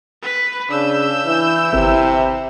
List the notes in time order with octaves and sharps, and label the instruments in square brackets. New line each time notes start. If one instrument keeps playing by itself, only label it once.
[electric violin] B4 B5
[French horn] C#3 [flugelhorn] D4 [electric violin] E6 G6
[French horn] E3 [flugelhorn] E4
[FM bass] G#1 [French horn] C3